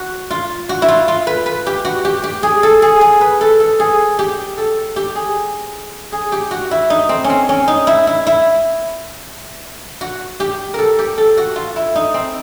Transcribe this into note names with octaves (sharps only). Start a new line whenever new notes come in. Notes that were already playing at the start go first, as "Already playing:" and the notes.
Already playing: F#4
F4
F#4
E4
F4
F4
B4
B4
G4
F#4
G4
G4
G#4
A4
G#4
G#4
B4
A4
A4
G#4
G4
A4
G4
G#4
G#4
G4
F#4
E4
D#4
C4
C#4
C4
C#4
D#4
E4
E4
E4
F#4
G4
A4 A#4
G4
A4
F#4
F4
E4
D#4
C4